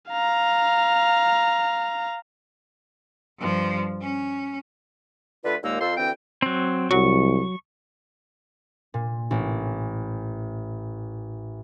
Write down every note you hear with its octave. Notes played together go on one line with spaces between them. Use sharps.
F5 A#5
G2 F3
C#4
D3 A3 F4 B4
D#2 A#2 G#3 A#3 D#4 E6
F2 F4 A4 C5 C6 E6
D2 E3 C4 G5
F#3 C4
C2 F#3 C#6
A#2
A1